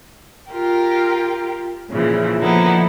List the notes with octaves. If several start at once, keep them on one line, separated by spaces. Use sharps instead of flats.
F4 G4 A#4
A#2 C#3 E3 F3
D3 F3 A#3 B3 D#4 E4